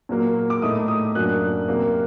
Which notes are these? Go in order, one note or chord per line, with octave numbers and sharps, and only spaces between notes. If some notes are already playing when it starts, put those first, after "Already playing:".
A#2 F#3 A#3
D6
A2 A3 D#4 D#6
D#6
F#2 F#3 A#3 D4 F#6
C3 F#3 A#3